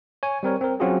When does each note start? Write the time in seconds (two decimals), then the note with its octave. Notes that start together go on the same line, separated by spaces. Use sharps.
0.23 C#5 G#5
0.43 G3 C4 A#4 C#5
0.61 C4 A#4
0.80 F#3 C4 C#4 F4 F#4 G#4